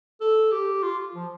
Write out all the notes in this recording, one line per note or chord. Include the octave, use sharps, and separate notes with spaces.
A4
G4
F4
F3